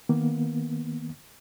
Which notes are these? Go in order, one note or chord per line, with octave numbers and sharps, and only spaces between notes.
D#3 A#3 B3